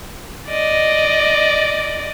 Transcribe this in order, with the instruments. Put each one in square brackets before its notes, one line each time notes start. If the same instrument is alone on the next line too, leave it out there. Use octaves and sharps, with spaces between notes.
[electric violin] D5 D#5